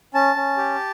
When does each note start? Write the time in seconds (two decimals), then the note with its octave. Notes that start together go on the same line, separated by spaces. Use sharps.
0.14 C#4 A5
0.36 C#4
0.57 G4